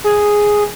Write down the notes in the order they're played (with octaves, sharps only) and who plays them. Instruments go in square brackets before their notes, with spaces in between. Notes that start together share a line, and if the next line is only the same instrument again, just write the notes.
[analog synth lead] G#4